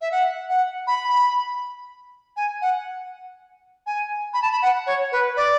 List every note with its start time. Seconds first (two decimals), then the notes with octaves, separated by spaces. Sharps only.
0.01 E5
0.12 F#5
0.49 F#5
0.87 B5
2.37 G#5
2.62 F#5
3.86 G#5
4.34 B5
4.42 A5
4.52 B5
4.62 F#5
4.87 C#5
5.12 B4
5.37 D5